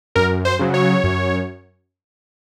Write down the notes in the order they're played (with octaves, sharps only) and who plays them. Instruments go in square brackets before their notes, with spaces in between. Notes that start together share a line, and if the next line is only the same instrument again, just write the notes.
[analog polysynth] F#2 A#4
C5
C#3 F#3
C#5
F#2